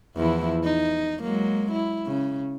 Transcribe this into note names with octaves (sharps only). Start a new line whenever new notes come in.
E2 F3 E4
D#4
F#3 G#3 A#3
E4
C#3